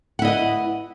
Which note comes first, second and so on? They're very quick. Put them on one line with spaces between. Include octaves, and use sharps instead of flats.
F#5 E4 D#5 B4